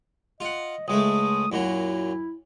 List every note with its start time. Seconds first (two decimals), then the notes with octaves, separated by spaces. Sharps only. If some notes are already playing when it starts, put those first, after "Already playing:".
0.40 F4 D#5 F#5
0.88 C#2 G#3 A3 D#6
1.52 F#2 A#2 F#3 E4